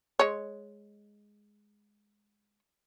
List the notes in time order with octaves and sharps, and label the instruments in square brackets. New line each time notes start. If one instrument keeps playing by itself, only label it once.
[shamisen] G#3 C#5